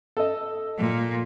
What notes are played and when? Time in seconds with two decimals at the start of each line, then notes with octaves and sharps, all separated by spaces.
0.17 A4 D#5
0.78 A#2